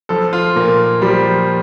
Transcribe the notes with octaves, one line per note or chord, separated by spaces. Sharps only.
F3 A4
F4
A#2 A#3
F3 G3